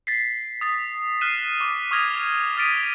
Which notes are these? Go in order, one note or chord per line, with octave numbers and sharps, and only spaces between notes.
A6 B6 C7
D#6 A6 B6
F6 F#6 B6 C7 D#7 E7
C#6 D6
C#6 D#6 F6 G#6 A#6 F7
D#6 F6 A6 B6 D7 D#7